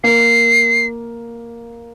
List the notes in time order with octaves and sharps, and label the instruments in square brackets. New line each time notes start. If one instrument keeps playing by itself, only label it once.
[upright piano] A#3 [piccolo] C7